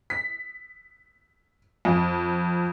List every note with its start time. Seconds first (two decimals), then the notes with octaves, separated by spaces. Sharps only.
0.10 B6
1.85 F2